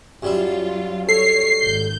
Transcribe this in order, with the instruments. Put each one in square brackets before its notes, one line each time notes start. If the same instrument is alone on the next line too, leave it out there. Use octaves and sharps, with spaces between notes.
[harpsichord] F#2 G3 E5 [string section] F#3 F4
[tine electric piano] A4 [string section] C#5 [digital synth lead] C7
[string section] G#1 G6